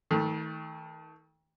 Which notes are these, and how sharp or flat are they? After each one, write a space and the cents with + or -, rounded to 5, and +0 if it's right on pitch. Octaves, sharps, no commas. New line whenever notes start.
D#3 +35 A3 +0